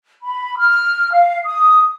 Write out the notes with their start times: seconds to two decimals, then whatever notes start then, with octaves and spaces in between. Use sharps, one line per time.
0.22 B5
0.58 F6
1.13 F5
1.45 D#6